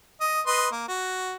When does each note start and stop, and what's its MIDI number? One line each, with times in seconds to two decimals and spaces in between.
0.21 0.41 75
0.47 0.68 71
0.47 0.68 75
0.47 0.68 84
0.72 0.84 58
0.88 1.35 66